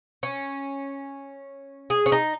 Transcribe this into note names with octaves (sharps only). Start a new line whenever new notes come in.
C#4
G#4
C#4
D#4